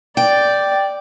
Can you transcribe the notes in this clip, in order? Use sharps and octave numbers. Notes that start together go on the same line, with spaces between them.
D5 G5